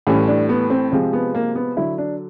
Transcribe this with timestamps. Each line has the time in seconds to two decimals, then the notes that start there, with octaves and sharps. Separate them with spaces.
0.07 A2 E3 G3 C#4
0.28 D4
0.49 B3
0.70 C4
0.92 C3 F3 G#3 C4
1.13 B3
1.35 A#3
1.55 B3
1.76 D3 F#3 E4
1.98 D4